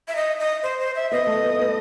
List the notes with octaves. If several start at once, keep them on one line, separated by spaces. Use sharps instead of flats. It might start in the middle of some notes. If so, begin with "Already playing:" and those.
E5
D#5
D#5
C5
C5
E5
B3 D#5
A3
B3
B3